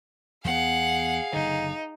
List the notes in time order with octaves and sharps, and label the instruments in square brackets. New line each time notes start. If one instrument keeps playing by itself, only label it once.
[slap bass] E2 B3 [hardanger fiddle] G#4 F5 [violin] F#5
[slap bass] F#1 D3 [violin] D#4